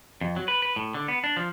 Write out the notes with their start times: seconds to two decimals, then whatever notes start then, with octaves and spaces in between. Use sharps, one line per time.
0.21 F2
0.36 F#3
0.48 B4
0.62 B4
0.76 A2
0.94 D3
1.08 B3
1.24 D4
1.37 F3